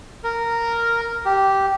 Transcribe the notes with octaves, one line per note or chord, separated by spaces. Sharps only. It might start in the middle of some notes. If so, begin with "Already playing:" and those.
A#4
G4